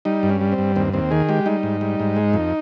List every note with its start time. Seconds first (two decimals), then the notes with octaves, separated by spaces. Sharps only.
0.05 G3 D#4
0.23 G2
0.29 C#4
0.41 G3
0.52 C4
0.58 G2
0.76 D#2 C4
0.93 D#2 C4
1.11 D#3 G#4
1.29 G#3 G4
1.46 G3 D#4
1.63 G#2
1.81 G3
2.00 G#2
2.16 G#3
2.34 F2